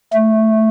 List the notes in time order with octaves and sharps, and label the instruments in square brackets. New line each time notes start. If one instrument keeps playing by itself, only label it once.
[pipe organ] A3